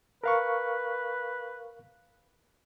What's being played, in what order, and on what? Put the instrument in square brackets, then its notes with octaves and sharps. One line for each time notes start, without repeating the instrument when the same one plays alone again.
[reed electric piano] A#4 F5 C#6 [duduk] B4